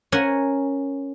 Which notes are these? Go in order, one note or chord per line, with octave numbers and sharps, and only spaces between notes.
C#4 A#4 F#5 G#5